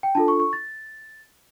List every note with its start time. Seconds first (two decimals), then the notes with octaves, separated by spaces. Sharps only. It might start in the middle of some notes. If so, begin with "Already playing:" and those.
0.03 G5
0.15 D4 F4 A4 A5
0.28 C#6
0.40 C#6
0.53 A6